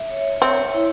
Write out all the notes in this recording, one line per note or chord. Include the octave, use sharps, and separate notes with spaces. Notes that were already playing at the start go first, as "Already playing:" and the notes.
Already playing: E5
C#5
C4 C#5
E4